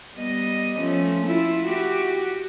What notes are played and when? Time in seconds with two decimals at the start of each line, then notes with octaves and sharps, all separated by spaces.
0.15 G3 B3 D#5
0.79 F3 A3 C#4
1.25 E4 F4
1.66 F#4 G4